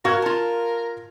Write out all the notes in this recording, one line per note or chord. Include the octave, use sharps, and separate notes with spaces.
F#4 A#4 F5 F6 G#6
F4 A5